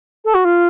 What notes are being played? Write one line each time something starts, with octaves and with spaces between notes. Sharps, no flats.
A4
F#4
F4